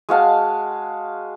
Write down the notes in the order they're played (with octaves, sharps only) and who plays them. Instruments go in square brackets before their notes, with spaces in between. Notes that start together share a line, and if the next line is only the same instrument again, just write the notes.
[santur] G#3 F#4 F5 A5